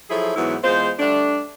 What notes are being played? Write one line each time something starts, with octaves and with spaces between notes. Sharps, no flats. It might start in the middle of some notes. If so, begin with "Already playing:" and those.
F3 F#3 E4 G#4 A4
G#2 E3 F#3 B3 E4
E2 G#3 F4 C5
G3 A3 D4